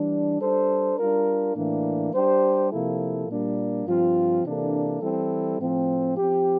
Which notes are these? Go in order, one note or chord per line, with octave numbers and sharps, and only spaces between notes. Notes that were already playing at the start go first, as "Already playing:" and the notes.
Already playing: E3 G3 D4
G3 D4 A4 C5
G3 D4 F4 A#4
A2 E3 A#3 D4
G3 D4 G4 C5
C3 F3 A#3 E4 A4
A#2 G3 A#3 D4
G2 F3 C4 F4
C3 E3 A#3 D4 A4
E3 G3 C4 E4 A4
A2 F3 C4
F3 C4 G4